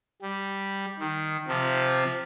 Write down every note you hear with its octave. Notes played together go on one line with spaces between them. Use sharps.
G3
D#3
C3 F3